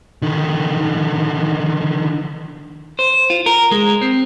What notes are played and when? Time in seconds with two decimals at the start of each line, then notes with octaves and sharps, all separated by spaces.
0.22 D3 D#3
2.99 C5
3.30 F4
3.46 A#4
3.72 G#3
4.01 C4